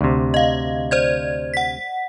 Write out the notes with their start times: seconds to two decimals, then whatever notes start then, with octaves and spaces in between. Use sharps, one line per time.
0.01 D2 C3
0.34 D#5 F5
0.91 C5 D5 G#6
1.54 F#5 B6